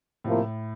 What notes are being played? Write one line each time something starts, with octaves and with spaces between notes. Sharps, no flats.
A2 C3 F3 A#3 E4